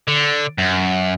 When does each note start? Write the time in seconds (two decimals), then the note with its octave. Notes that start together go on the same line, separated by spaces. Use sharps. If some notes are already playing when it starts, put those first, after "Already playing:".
0.08 D3
0.58 F#2